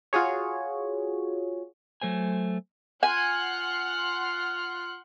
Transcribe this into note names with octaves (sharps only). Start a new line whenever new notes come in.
F4 F#4 G#4 C#5
F#3 A3 C5 G#5
F4 F#5 G#5 C6 F6 F#6